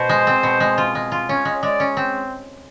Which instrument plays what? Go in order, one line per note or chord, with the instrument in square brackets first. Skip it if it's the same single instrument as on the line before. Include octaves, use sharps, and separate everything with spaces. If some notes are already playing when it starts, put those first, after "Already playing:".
Already playing: [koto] B2 [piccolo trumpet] C5
[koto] G#3
C4
B2
G#3
F4
G#3
F4
[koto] C#4 [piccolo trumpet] C#5
[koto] G#3
[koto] G#3 [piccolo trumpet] D5
[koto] C#4
C4